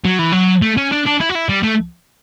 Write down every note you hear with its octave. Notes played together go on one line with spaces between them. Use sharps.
F#3
E3
F#3
A3
C#4
D4
D4
E4
F#4
E4
G3
A3